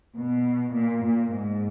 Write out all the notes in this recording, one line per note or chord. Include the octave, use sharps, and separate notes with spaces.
B2
A#2
A#2
G#2